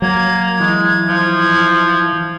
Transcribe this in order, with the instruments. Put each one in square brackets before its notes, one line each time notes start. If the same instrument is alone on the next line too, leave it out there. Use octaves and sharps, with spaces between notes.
[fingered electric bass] F#3 [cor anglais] A#3 [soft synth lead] G#6
[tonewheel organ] E3 [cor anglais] G#3
[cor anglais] F3